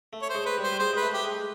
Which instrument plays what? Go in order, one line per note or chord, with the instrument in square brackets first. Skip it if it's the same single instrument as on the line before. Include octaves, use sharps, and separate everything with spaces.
[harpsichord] A3
[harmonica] C#5
C5
[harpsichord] G#3
[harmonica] B4
[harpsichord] G3
[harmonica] C5
[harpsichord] G3
[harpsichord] G#3 [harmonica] C5
[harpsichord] G#3 [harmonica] B4
[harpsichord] A3
[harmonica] G4
[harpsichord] G#3